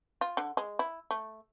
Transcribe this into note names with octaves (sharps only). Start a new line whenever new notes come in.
F4
D3
G#3
E4
A3